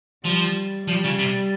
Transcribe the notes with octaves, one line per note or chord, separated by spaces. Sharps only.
F3 G3
F3 G3
C#3
C3